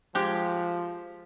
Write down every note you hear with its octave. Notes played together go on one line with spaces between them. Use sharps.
F3 G#3 G4